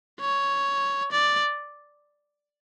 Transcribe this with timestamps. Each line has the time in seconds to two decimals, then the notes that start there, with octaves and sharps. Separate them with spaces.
0.20 C#5
1.12 D5